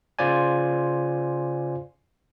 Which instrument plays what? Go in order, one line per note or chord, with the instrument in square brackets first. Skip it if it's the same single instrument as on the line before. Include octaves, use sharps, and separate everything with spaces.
[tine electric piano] C#3 F4 C5 D5 G#5